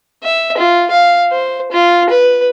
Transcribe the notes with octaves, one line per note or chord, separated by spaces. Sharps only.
E5
F4
F5
C5
F4
B4